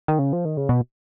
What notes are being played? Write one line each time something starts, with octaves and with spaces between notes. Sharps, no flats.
D#3
C#3
F3
D#3
C#3
B2